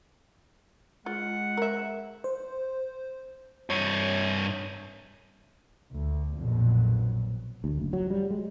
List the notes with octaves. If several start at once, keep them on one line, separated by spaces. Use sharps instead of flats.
G#3 F4 F#5
A#4 E5
C5
G2 C#5
D2
A#1 F2 B2 F#3
D2
F#1
F#3
G3
G#3